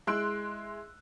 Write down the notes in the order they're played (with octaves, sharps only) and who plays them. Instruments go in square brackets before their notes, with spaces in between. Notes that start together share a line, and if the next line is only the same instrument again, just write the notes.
[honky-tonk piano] G#3 E4 C6 E6 F#6 D7